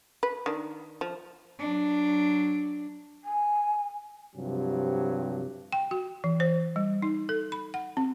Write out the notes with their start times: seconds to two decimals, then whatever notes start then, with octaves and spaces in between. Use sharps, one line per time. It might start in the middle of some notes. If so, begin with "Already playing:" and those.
0.23 B4
0.46 D#3 D4
1.01 F3
1.59 F#3 D4
3.24 G#5
4.36 G2 C3 F3 F#3
5.72 G5
5.91 F#4
6.24 E3
6.40 C5
6.76 G3
7.02 D#4
7.29 A4
7.52 B5
7.74 F#5
7.97 C4